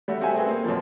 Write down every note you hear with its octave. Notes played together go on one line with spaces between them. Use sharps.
G3 A3 F#4 G4
C4 F#4 G4 E5 G#5
A3 C4 G#4 B4
A#3 C4
F#2 B2 F3